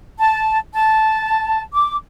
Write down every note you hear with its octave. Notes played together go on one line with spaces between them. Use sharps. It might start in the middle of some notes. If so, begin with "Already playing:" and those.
A5
A5
D6